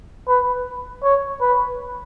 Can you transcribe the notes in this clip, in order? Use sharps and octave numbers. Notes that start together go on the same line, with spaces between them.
B4
C#5
B4